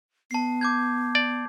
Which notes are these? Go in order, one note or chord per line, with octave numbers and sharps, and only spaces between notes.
B3 A5 C7
D6 G6 G#6
D5